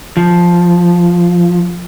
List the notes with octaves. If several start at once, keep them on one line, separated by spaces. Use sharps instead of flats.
F3